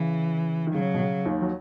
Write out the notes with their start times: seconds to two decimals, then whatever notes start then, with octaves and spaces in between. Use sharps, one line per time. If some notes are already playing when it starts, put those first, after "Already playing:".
Already playing: C#3 E3
0.67 D#3
0.74 C#3 F#3
0.94 B2
1.00 C#3
1.25 D#2 D#3
1.42 F#3